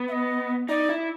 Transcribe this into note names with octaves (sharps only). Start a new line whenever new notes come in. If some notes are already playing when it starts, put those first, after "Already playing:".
Already playing: B3
E5
D#5
D#4 D5
E4